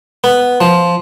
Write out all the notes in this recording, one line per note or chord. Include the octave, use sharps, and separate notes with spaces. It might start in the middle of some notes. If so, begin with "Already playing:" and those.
B3
F3